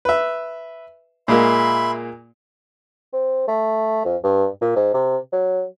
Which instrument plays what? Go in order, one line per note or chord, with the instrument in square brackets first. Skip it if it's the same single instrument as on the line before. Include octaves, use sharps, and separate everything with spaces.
[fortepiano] B4 E5
[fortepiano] A#2 G#3 A#3 [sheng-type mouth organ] E5 B5 C6
[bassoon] C4
A3
F2
G2
A#2
G#2
C3
F#3